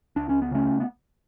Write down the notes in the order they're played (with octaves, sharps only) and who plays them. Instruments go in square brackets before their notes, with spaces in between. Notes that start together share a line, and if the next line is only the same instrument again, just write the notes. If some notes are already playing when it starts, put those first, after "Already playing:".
[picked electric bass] C#2 D4
C#4
B3
C#3 A3 C#4
B3